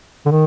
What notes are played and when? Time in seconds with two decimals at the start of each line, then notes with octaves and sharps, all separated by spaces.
0.26 D3
0.31 D#3